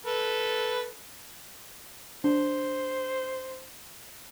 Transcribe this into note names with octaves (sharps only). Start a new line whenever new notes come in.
A4 B4
D4 C5